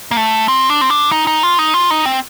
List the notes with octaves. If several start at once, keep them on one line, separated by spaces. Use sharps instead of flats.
A#3
A3
C4
D4
C4
D4
D#4
D#4
F4
D#4
F4
D#4
C4